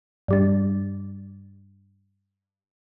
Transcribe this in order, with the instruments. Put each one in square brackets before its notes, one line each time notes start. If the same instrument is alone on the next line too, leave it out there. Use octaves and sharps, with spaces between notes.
[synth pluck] G2 G3 D4